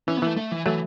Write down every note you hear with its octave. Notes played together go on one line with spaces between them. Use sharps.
E3 C#4
B3
E3 A3
A3
E3
E3 F#3 A3